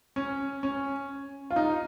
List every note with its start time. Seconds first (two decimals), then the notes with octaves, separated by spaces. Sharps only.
0.16 C#4
0.63 C#4
1.51 F4
1.56 D#4